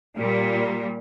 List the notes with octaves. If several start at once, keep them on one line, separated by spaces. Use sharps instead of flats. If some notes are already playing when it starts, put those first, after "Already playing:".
A#2 G3